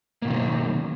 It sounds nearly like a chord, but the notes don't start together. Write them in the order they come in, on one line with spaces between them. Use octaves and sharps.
A#3 B2 D#3 C#4 F#3